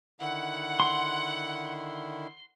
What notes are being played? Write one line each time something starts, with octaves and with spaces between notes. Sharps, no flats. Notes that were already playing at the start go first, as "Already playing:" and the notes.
D3 D#3 E4 F#5
C6